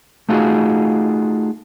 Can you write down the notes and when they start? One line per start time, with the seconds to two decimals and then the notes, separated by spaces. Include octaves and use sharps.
0.29 A3 D#4 F4 F#4 G#4